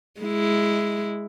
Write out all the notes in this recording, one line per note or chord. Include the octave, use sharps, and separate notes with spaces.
G#3 E4